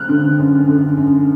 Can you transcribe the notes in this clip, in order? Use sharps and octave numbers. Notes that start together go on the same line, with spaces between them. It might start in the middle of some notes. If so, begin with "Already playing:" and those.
Already playing: F6 F#6
D3
F#2
D3
F#2